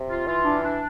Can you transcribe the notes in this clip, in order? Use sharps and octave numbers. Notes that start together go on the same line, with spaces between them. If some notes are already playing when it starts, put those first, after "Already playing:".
Already playing: C3
F4
E3 F4
D4
D4